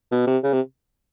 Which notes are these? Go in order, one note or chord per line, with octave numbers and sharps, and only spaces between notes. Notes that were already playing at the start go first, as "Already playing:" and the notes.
B2
C3
C#3
C3